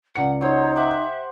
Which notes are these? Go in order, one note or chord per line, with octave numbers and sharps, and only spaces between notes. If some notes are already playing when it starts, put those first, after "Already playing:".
C#2 D5 F#5 C#7
F#3 D#4 C5 C#5 D#6
G4 C5 E5 F#5